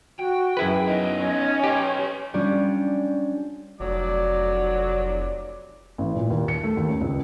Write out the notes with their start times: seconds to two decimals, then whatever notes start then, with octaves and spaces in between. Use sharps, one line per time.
0.19 F#4 G5
0.57 F#2 E4 G#4 B4
0.87 B3 D#4 D#5
1.20 C#4
1.64 G4 B4 C#5
2.34 G3 C#4 D4 F4 G4
3.80 F1 F#3 D5
5.98 A1
6.16 A#2
6.30 D#2
6.48 C#7
6.63 A3
6.77 D#2
6.89 C#4
7.01 C#2